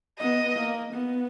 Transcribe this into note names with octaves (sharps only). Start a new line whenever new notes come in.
B3 D#5
A#3
B3